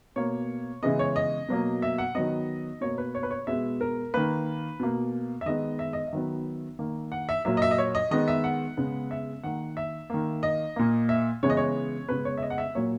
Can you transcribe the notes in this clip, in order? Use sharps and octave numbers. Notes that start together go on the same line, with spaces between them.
B2 A#3 C#5
C#3 E3 G#3 B3 D#5
C#5
D#5
B2 F#3 A#3
E5
F#5
D#3 F#3 B3 D#5
B2 A#3 C#5
B4
C#5
B4
C#5
B2 G#3 B3 E5
A#4
D#3 A#3 B4
B2 A#3
E5
D#3 G#3 B3 D#5
E5
D#5
E5
D#3 F#3 B3
D#3 A#3
F#5
E5
A#2 F#3 A#3 E5
D#5
E5
D#5
C#5
D#5
D#3 G#3 B3 D#5
E5
F#5
C#3 G#3 B3
E5
D#3 A#3 F#5
E5
D#3 A#3
D#5
A#2 A#3
E5
C#3 E3 G#3 B3 C#5
D#5
C#5
C#3 G#3 B3 B4
C#5
E5
D#5
F#5
E5
A#2 F#3 A#3 C#5